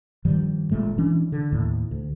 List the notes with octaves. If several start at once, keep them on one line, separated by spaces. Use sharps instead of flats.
G2 D#3 F3 G3
G1 A#2 G#3 A3
E3 C#4 D4
D3
D#2 A2
D2